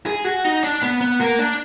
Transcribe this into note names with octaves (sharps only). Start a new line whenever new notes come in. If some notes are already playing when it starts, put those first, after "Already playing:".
G#4
F#4
D#4
D4
B3
B3
A#3
D4